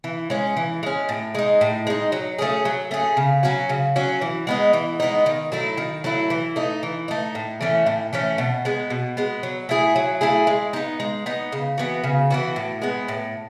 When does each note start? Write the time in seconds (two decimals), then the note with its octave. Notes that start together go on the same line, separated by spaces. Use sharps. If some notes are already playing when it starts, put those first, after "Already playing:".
0.04 E3
0.30 G#3 C#4
0.57 E3
0.83 G#3 C#4
1.09 A2
1.35 G#3 D#4
1.61 A2
1.87 G#3 D#4
2.12 F#3
2.38 A3 C#4 G#4
2.65 F#3
2.91 A3 C#4 G#4
3.17 C#3
3.43 F#3 C#4 F#4
3.69 C#3
3.96 F#3 C#4 F#4
4.21 E3
4.47 G#3 B3 D#4
4.73 E3
5.00 G#3 B3 D#4
5.26 D#3
5.52 F#3 A3 E4
5.77 D#3
6.04 F#3 A3 E4
6.30 E3
6.56 A3 D#4
6.83 E3
7.08 A3 D#4
7.35 A2
7.61 E3 A3 C#4
7.87 A2
8.13 E3 A3 C#4
8.38 B2
8.65 G#3 B3
8.90 B2
9.17 G#3 B3
9.43 F#3
9.69 A3 E4 G#4
9.96 F#3
10.21 A3 E4 G#4
10.47 G#3
10.73 B3 D#4
11.00 G#3
11.26 B3 D#4
11.52 C#3
11.78 E3 B3 F#4
12.04 C#3
12.30 E3 B3 F#4
12.56 A2
12.82 G#3 B3
13.08 A2